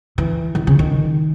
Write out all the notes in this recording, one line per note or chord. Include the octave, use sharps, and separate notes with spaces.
E3
D#3
C#3
D#3